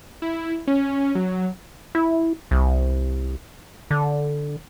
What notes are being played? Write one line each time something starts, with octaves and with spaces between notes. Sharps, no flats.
E4
C#4
F#3
E4
C2
D3